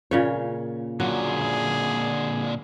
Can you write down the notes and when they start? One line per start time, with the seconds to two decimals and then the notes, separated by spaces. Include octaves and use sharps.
0.11 A#2 C#3 C#5
1.00 A#2 D3 F#3 G#4